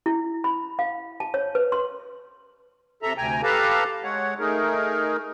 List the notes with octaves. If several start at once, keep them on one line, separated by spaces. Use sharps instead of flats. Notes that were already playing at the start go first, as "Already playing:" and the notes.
E4
B5
F5
A5
C#5
B4
C6
C3 A4 E5 A#5
D2 C3 G5 G#5 A#5
G4 A4 B4 F5 A5 A#5
G#3 C#5 F#5
A3 D#4 G#4 A#4